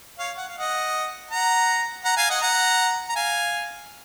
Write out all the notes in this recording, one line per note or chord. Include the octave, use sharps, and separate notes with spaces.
C#5 F5
F#5
F5
D#5 F#5
F#5 A#5
F#5 A#5
F5 G#5
D#5 F#5
F#5 A#5
A#5
F5 G#5